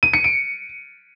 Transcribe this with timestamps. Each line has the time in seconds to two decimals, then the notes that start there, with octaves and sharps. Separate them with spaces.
0.03 D#7
0.14 C#7
0.24 D7